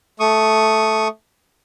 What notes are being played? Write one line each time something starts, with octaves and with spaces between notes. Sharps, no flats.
A3 C#6 D#6